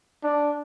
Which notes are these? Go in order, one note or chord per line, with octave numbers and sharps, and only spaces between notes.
D4